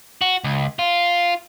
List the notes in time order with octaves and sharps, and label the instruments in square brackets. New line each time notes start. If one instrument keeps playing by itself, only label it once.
[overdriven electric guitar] F#4
C#2
F4